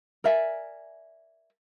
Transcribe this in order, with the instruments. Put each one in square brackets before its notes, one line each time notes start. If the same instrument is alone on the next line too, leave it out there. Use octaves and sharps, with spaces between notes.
[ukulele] A#4 D5 E5 G#5